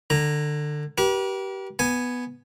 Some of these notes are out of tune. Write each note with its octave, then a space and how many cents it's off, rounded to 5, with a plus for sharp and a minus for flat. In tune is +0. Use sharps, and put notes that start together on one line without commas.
D3 +25 A#5 +0
G4 -25 B4 -45
B3 +0 G#5 +0